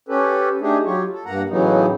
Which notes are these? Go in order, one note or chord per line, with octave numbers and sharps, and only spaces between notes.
C#4 G4 A4 B4
A3 D4 D#4 G4 G#4
F#3 F4 G4 C#5
A4
G2 A#3 F#5 A#5
A2 C#3 E3 F#3 B3 D#4